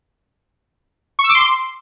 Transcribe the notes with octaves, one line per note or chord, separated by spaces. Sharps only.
C#6
E6
D6
C6